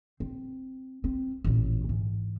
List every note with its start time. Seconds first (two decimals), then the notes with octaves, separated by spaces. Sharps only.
0.20 C4
1.04 C4
1.44 A1 A#2
1.89 G#2 E3